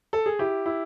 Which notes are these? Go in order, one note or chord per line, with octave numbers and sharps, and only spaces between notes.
A4
G#4
E4 G4
E4